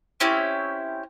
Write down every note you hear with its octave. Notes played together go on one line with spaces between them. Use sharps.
C4 C#4 E4 G4